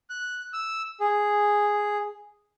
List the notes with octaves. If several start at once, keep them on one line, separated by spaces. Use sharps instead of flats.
F#6
E6
G#4